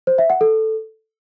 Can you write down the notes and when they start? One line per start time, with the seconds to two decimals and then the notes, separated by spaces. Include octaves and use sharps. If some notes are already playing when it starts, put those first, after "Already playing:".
0.07 C5
0.18 E5
0.30 F#5
0.41 A4